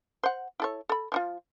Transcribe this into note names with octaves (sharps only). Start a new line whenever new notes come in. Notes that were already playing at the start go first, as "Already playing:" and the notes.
C5 F#5
E4 A4 C#5
A4 B5
F3 D#4 F4